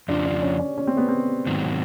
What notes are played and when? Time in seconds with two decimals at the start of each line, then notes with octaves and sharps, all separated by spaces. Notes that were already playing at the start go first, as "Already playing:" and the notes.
0.08 F2 C#3 F3 D4
0.25 D4
0.42 C#4
0.59 C#4
0.78 C#4
0.87 C4
0.97 B3
1.09 C4
1.47 G#2 D#3 F#3